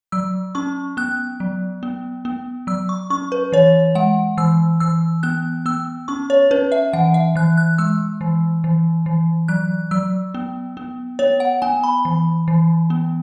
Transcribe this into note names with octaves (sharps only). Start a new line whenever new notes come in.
F#3 E6
C#4 C#6
B3 F#6
F#3
B3
B3
F#3 E6
C#6
C#4 C#6
B4
E3 C#5
G#3 F#5
E3 E6
E3 E6
B3 F#6
B3 E6
C#4 C#6
C#5
C#4 B4
E5
E3 F#5
E5
E3 F#6
F#6
G#3 E6
E3
E3
E3
F#3 F#6
F#3 E6
B3
B3
B3 C#5
F#5
B3 G#5
B5
E3
E3
B3